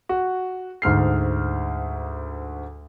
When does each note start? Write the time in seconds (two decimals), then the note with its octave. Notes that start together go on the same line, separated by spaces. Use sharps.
0.09 F#4
0.82 D2 G#2 F6 C7